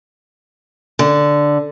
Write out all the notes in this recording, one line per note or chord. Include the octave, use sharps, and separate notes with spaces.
D3